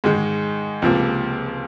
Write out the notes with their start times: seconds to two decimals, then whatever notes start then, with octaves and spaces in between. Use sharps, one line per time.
0.04 G#2 D#3 G#3
0.82 C#2 C3 F3 A#3